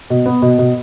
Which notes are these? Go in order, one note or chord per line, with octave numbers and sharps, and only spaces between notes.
B2
B3
B2
B2